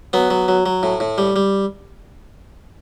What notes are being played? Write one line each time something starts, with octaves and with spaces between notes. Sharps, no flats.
F#3 B3
F#3
F#3
F#3
A2
A2
G3
G3